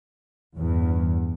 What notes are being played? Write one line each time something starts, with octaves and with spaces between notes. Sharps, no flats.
E2 G2